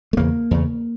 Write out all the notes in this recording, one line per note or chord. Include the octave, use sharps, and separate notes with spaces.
A3
E2 C#3 A#3
E2 C#3